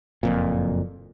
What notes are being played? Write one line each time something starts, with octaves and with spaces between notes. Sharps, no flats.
F#1 F2 A#2